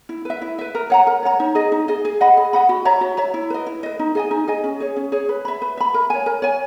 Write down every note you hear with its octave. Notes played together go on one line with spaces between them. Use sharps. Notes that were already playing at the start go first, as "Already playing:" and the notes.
E4
B4 E5
E4
B4 E5
A#4
C#5 F#5 A#5
A#4
C#5 F#5 A#5
D#4
G#4 D#5
D#4
G#4 D#5
G#4
D#5 F#5 B5
G#4
D#5 F#5 B5
F#4
C#5 E5 A#5
F#4
C#5 E5 A#5
E4
B4 D#5
E4
B4 D#5
D#4
G#4 D#5 G#5
D#4
G#4 D#5 G#5
C#4
G#4 C#5
C#4
G#4 C#5
B4
E5 B5
B4
E5 B5
A#4
C#5 G#5
A#4
C#5 G#5